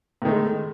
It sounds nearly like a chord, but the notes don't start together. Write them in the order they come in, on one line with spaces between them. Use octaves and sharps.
A2 D#3 A3 G#3